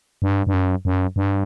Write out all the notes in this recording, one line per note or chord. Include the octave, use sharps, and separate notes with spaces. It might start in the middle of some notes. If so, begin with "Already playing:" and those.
G2
G2
F#2
F#2
G2